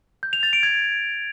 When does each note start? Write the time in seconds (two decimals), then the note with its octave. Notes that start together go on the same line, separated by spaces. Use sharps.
0.23 G6
0.33 F7
0.43 A6
0.53 D7
0.63 G#6